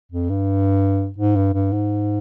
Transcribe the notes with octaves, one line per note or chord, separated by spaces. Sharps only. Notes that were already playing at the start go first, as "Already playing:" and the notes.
F2
G2
G#2
G2
G2
G#2